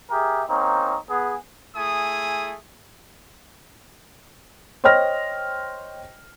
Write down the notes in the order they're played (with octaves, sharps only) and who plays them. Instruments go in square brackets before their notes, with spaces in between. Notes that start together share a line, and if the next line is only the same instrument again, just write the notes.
[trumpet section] G4 G#4 A#4 E5
A#3 C4 C#4 D#4
B3 G#4
A3 E4 G#4 G#5 D#6
[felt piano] C5 C#5 D#5 G5 F6 A#6